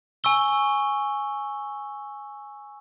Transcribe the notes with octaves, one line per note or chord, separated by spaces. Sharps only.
G#5 C#6 E6 G7